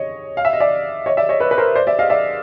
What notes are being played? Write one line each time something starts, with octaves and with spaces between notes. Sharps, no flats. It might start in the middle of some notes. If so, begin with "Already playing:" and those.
Already playing: C#5 D#5
F5
E5
D#5
D5 E5
C#5 D#5
D5 E5
C#5 D#5
B4 C#5
B4
A#4 C5
C5 D5
D5 E5
D#5 F5
D5 E5